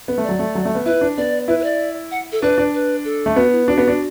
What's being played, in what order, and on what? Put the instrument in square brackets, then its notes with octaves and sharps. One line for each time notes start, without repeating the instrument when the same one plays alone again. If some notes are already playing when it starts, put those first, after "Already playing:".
[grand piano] B3
A3
[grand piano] F#3 [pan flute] D5
[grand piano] A3
F#3
A3
B3
[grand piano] E4 [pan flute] B4
[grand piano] D4
[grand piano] B3 [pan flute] D5
[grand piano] E4 [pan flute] B4
[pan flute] B4
D5
F#5
A4
[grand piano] D4 [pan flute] B4
[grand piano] D4
[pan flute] B4
A4
[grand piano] A3
[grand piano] B3 [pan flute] F#4
[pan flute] E4
[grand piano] D4 [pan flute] F#4
[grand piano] B3
D4